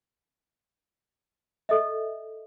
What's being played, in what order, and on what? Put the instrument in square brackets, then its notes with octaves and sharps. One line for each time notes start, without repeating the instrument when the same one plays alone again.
[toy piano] A4 D#5 E5